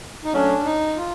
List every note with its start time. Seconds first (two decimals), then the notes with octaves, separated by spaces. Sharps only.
0.24 D#4
0.34 F#3 A3 C#4 D4
0.65 D#4
0.97 F4